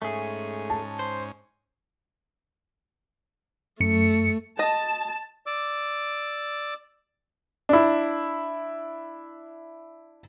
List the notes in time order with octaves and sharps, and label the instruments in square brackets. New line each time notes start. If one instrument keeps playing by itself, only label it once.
[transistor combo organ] G#2 C#4 [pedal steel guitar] A3 G#4
[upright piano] A5
[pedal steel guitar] C5
[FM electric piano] F#2 C#7 [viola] A3
[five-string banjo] D#5 [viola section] A5
[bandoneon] D5 D6 E6
[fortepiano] D4 E4